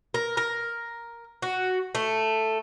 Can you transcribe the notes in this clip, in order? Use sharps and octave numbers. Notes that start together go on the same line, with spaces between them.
A#4
A#4
F#4
A3